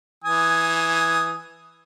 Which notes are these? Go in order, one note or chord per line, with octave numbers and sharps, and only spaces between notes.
E3 G#5 D#6